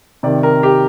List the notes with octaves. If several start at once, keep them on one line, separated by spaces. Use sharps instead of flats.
C3 D#3 D5
A#4
G4